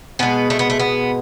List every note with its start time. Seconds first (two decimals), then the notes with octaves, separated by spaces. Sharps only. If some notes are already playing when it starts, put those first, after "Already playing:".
0.19 B2 G#3 B3
0.50 A3
0.59 B3
0.70 A3
0.79 B3